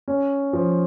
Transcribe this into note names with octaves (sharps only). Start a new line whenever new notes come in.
C#4
F3